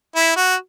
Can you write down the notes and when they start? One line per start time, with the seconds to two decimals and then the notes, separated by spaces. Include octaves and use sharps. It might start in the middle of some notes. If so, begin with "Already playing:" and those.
0.16 E4
0.36 F#4